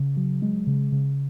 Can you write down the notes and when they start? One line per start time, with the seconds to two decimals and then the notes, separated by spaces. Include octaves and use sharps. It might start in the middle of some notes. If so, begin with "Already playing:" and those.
Already playing: C#3
0.17 F#3
0.42 G#3
0.67 C#3
0.92 C#3